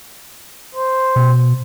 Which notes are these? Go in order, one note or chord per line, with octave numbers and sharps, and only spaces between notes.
C5
B2